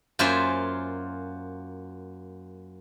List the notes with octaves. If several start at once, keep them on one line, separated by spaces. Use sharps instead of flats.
F#2 A#3 F4 C5 E5 G#5